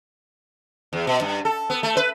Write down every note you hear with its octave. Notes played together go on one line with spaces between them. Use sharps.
E2
B2
G2
A4
B3
A3
B4